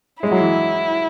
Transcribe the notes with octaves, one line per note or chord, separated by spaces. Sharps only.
G#3 E4
F#3
E3